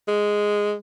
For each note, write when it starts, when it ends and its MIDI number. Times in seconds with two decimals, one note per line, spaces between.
0.08 0.74 56